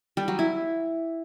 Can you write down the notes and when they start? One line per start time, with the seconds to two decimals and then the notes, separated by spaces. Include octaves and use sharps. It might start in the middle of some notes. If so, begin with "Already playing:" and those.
0.17 G3
0.28 F#3
0.39 E4